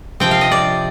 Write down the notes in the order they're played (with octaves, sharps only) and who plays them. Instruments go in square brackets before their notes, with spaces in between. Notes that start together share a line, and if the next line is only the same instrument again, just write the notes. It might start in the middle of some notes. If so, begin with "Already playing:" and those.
[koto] C3 F3 C4 G5
F5
D#5
D5